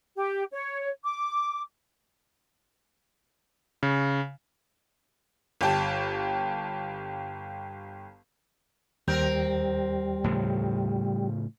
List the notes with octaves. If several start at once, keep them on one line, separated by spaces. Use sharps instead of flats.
G4
C#5
D6
C#3
G1 G4 A5
D#2 G3 C4 A#4 G6
A2 C#3 F3